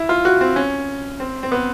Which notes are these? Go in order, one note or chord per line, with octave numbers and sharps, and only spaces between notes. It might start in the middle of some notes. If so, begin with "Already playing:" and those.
Already playing: E4
F4
F#4
C4
C#4
C4
C4
B3